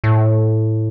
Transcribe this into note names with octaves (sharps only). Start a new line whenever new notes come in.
A2